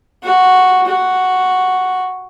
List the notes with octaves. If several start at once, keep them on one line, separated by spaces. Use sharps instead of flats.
F#4
F#4